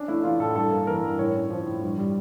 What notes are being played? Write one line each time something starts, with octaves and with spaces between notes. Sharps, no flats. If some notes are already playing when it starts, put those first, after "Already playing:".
Already playing: C#4 D4
A3 E4
E3 F4
A2 A4
G2 A4
A#3
E3 A#4
G2
A2 C#5
C#4
F3
A2
G2
G3